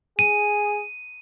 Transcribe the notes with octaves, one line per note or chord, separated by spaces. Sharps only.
G#4 D#7